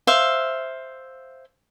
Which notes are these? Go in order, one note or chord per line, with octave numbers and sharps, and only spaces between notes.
C5 E5 F5